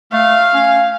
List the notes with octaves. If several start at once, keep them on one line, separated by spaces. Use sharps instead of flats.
A3 F5
C#4